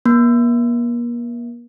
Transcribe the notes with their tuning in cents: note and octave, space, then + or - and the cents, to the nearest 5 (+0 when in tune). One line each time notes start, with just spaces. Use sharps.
A#3 +40